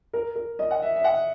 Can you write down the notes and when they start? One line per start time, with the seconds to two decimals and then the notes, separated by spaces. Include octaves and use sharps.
0.13 A#4
0.36 A#4
0.59 D#5
0.71 F#5
0.82 E5
0.96 E5
1.04 F#5